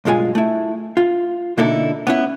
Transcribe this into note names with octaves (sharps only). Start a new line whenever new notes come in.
B1 G2 G#3 F4 G#5
A3 E4
F4
B2 D3 A#3 D#4 E4 A4
B3 C#4 E4